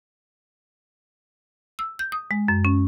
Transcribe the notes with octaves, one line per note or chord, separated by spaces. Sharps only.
E6
G6
D#6
G#3
F#2
C#4